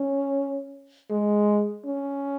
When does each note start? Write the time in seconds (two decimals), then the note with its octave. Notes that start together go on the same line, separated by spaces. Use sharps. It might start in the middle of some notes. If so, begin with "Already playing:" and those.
Already playing: C#4
1.11 G#3
1.86 C#4